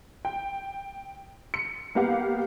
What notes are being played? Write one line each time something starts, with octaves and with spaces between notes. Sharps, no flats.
G5
C#7
A#3 B3 G4 F5 F#5